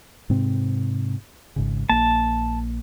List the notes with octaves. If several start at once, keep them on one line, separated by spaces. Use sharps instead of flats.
G#2 C3 C4
G#1 G#2 C#3
A#1 A#3 A5